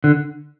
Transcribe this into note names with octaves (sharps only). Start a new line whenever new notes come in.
D3